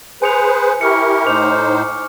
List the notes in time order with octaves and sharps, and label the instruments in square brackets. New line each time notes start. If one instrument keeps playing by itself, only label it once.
[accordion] G#4 B4 C5 [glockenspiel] G#5 C#7 F7
[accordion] E4 G4 A#4 [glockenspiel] C#6 F6 C#7
[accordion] A2 D#4 C5 [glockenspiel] D6 F6 F7